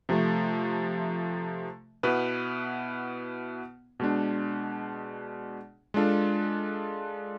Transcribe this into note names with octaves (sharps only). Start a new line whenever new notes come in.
C3 F3 A3
B2 B3 E4 B4
B2 G#3 D4
G#3 D4 F4 A4